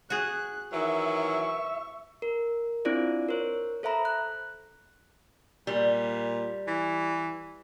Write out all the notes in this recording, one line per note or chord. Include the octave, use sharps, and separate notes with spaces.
F#4 G#4 F#6
D#3 E3 F#3 E5 C#6
A#4
C4 D4 E4 F4 C5 D5
A#4 C5 C#5
A4 C5 E5 A#5 B5
F#6
A#2 G3
E3